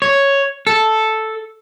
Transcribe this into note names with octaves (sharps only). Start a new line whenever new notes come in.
C#5
A4